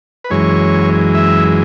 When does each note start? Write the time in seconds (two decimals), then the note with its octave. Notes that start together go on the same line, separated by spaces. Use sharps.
0.24 B4
0.30 F#2 E3 G#3 C#5
1.15 E5